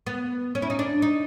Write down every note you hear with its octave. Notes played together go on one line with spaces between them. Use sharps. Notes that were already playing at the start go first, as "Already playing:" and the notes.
B3
C#4
E4
D#4
D4
D#4